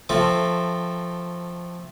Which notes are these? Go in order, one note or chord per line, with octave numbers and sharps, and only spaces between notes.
F3 A3 C4